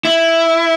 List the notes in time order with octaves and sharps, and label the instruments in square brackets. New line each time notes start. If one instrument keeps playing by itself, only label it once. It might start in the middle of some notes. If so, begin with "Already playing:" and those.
[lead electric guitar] E4